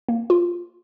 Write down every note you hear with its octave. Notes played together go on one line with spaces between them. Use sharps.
A#3
F4